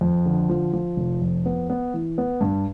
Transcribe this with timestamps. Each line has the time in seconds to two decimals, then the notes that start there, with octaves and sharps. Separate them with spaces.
0.01 F2
0.26 D3
0.49 F3
0.73 F3
0.97 F1
1.22 F2
1.46 B3
1.70 B3
1.94 E3
2.18 B3
2.41 G2